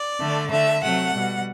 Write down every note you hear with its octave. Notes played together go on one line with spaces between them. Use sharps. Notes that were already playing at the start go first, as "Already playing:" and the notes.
Already playing: D5
D3 A3
D3 A3 E5
C3 F#3 A3 F#5
B2 G3